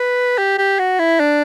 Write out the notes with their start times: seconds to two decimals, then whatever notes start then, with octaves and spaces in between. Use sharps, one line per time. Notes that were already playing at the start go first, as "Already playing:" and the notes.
Already playing: B4
0.38 G4
0.58 G4
0.79 F#4
0.99 E4
1.20 D4